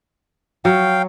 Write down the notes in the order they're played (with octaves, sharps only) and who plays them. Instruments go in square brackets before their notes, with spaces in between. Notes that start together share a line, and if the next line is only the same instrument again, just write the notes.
[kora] F#3 [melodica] F5 G5